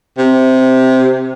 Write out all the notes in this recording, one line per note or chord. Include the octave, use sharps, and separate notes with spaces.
C3